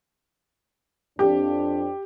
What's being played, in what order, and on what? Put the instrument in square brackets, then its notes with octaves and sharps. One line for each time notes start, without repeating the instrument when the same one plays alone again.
[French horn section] F2 D4 [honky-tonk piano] G4